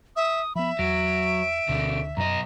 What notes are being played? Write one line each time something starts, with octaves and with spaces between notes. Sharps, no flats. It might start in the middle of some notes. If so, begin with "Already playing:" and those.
E5 D#6
F3 B3 E5 B5
E2 F#3 D7
D2 B2 D3
B1 F#2 D#5 A#5